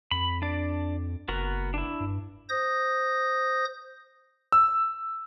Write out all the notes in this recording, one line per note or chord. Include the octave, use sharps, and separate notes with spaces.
F2 B5
D4 D5
F#1 B3 F#4 A#4
D4 E4
G2
C5 D#6 G6 A#6
E6